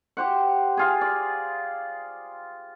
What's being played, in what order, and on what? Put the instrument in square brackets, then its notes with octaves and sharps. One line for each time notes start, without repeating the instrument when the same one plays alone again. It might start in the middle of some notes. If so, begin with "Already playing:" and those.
[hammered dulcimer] G4 C5 F#5
F4 G#4
D5